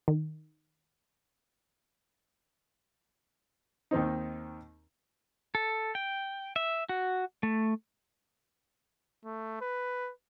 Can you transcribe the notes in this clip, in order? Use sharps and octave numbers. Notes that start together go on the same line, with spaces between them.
D#3
D#2 D#3 C4 D#4
A4
G5
E5
F#4
A3
A3
B4